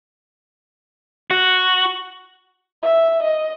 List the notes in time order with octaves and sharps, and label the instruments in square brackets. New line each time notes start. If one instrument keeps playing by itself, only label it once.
[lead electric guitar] F#4
[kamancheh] E5
D#5